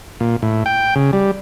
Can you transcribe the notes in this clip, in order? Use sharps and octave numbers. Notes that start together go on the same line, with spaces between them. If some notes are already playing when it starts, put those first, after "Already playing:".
A#2
A2
G5
C#3
G3